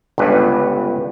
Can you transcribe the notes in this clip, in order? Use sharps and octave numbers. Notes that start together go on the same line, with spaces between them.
G1 C#2 G2 B4